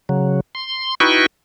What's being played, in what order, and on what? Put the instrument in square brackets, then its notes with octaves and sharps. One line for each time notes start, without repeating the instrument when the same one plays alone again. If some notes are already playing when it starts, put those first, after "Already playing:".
[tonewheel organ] C#3 F#3
C6
D#4 E4 F#4 B4 G5 C#6